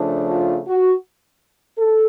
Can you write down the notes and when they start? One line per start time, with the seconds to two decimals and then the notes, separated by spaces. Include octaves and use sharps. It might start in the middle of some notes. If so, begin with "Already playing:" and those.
Already playing: C#3 F3 A3 D4
0.31 F4
0.68 F#4
1.78 A4